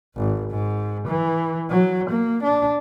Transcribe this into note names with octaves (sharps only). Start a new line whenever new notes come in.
G#1
G#2
E3
F#3
A#3
D4